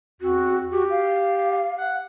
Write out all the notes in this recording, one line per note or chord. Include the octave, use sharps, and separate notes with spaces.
E2 C4 F#4
F#4 G4
F5
F#5